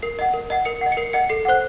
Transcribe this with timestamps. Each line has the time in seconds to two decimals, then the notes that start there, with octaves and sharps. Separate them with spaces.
0.02 A#4 C7
0.19 D#5 F#5
0.34 A#4
0.50 D#5 F#5
0.65 A#4 C#7
0.81 D#5 F#5
0.92 C#7
0.97 A#4 C7
1.13 D#5 F#5 C#7
1.29 A4 C7
1.45 C5 F#5 F#6